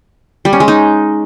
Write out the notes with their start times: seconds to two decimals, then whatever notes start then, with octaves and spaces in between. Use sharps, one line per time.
0.45 G3
0.53 C#4
0.60 G#3
0.68 D#4